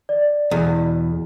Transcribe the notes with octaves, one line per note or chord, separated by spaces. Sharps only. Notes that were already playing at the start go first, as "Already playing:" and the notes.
D5
E2 B2